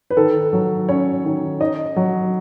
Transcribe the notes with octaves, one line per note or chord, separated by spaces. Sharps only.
B4
D#3 A4
F#3
C#4 C#5
D#3
D#4 D#5
F#3